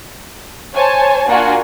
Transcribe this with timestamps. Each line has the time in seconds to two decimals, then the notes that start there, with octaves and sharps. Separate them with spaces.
0.75 C5 C#5 G#5 A5
1.27 A#3 D4 F4 F#4 F#5 G#5